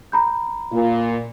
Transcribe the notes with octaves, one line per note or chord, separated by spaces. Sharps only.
A#5 B5 G6
A#2 F4